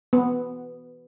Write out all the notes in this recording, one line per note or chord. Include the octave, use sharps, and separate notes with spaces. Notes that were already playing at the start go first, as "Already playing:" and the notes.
B3